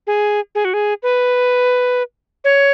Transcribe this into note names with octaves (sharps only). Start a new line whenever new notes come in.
G#4
G#4
F#4
G#4
B4
C#5